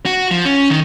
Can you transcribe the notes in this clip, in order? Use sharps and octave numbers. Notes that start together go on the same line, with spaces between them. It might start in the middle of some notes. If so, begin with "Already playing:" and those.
F#4
F3
C#4
D#3